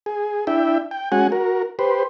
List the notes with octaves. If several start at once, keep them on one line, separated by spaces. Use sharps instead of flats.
G#4
D4 E4 E5 G5
G5
G#3 C#4 F#4 F#5 G#5
F#4 A#4
G4 B4 C5